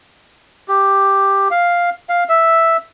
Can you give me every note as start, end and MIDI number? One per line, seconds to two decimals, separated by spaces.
0.68 1.48 67
1.51 1.90 77
2.09 2.24 77
2.29 2.77 76